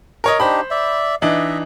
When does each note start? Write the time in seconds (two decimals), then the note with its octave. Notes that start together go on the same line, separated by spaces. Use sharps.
0.24 A#4 C#5 D#5
0.40 D4 D#4 G4 C5 B5
0.71 D5 E5
1.22 E3 D4 D#4 D#5 E5